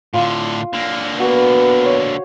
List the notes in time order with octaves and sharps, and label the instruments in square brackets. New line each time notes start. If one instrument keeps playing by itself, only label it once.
[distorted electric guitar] A2 D3 [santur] F4
[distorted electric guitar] D3 A#3
[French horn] B3 [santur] F#4
[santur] C5 C#5